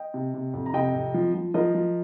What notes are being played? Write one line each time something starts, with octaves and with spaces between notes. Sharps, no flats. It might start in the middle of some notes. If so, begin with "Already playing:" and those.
Already playing: D#5 G5
C3
C3
F2
A#5
C3 D#5 G5
F2
F3
F3
F3 A#4 D#5
F3